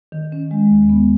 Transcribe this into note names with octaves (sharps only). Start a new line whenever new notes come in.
D#3
C#4
G#3
D#2
B3